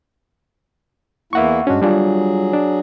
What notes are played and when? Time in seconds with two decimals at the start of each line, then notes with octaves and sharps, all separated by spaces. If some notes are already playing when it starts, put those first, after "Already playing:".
1.33 E2 A#3 E4 E5 F#5 C#6
1.67 G2 G#3 C#4 D4 F#4
1.82 F#3 G3 D4 F4 G#4
2.53 D4